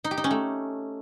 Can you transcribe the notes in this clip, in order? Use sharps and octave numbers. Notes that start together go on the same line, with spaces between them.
D#4
G4
D#4
C#4
A3